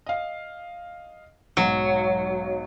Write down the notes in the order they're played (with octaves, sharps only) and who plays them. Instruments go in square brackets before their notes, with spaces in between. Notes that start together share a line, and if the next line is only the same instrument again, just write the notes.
[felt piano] D#5 F5
[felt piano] B1 G#2 [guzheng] F#3